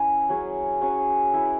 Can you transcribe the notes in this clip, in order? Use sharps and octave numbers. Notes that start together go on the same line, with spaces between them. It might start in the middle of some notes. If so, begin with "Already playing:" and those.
Already playing: C#4 E4 B4 E5
F#3 C#4 G#4 C#5
F#3 C#4 G#4 C#5
E4 B4 E5